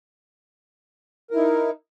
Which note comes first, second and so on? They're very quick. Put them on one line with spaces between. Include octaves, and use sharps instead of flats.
A#4 E4 D#4